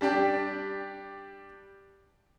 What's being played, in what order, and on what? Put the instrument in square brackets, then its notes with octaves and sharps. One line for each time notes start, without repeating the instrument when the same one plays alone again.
[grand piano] G3 D4 G4 D5